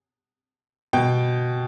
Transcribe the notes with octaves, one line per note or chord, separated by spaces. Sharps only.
B2 G5